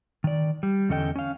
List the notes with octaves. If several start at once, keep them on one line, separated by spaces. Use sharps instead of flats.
D#3 D5
G3
E2 D3 C#4 A4 D#5 G5
C#4 F5